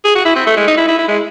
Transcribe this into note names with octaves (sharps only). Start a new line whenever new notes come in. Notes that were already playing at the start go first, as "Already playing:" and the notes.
G#4
F#4
E4
C4
A3
G#3
D#4
E4
E4
E4
G#3